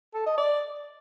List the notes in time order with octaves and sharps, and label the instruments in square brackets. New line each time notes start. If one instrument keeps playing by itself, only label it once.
[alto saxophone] A4
D#5
D5